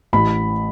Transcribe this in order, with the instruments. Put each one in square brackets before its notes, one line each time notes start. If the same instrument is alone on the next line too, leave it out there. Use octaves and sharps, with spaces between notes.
[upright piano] A1 B5